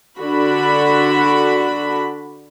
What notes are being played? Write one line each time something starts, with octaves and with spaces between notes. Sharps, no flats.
D3 D4 F#4 B5